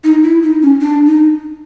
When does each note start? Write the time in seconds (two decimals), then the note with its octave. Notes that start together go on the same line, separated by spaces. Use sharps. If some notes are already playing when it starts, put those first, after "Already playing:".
0.04 D#4
0.23 E4
0.42 D#4
0.62 C#4
0.81 D4
1.06 D#4